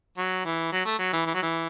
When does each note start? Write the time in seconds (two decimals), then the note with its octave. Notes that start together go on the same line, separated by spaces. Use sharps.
0.18 F#3
0.45 E3
0.72 F#3
0.85 A3
0.99 F#3
1.13 E3
1.26 E3
1.34 F#3
1.42 E3